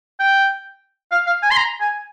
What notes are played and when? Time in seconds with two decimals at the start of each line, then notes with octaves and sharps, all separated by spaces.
0.20 G5
1.12 F5
1.27 F5
1.43 G#5
1.51 C6
1.57 A#5
1.81 G#5